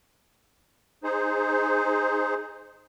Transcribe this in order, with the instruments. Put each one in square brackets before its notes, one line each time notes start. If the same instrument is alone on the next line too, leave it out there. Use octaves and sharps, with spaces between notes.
[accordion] D#4 G#4 C5